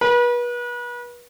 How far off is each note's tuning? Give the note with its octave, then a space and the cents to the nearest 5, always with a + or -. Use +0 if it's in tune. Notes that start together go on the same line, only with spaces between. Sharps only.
B4 -35